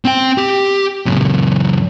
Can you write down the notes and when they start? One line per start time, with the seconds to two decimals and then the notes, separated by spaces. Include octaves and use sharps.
0.05 C4 G5
0.38 G4
1.06 C#2 F#2